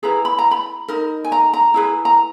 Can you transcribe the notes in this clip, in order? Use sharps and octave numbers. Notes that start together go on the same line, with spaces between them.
E4 G#4 B4 A#5
B5
A#5
B5
D#4 A#4
G#5
A#5
A#5
E4 G#4 B4
A#5